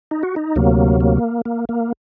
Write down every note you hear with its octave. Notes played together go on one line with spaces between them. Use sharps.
D#4
F#4
D#4
D2 C3 F#3 A#3
A#3
A#3
A#3